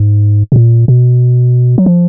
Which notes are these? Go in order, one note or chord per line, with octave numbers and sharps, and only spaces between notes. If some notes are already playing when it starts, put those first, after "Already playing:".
Already playing: G#2
B2
A#2
B2
F#3
F3